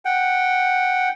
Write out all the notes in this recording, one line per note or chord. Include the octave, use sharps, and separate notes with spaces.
F#5 G5